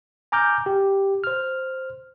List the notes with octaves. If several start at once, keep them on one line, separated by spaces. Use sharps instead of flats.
G#5 A#5 D6 F6 G6
G4
C5 F6